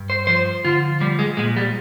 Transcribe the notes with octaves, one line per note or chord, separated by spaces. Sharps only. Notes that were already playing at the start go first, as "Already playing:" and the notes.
Already playing: G2
C5
F3 C5
D3 F4
F3 G3
G#3
A#2 G#3
G3